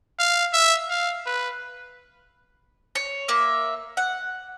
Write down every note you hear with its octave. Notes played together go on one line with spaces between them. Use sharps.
F5
E5
F5
B4
C#5
A#3 E5
F#5